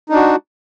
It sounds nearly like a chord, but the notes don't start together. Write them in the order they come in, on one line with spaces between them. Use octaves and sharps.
D#4 D4 F#4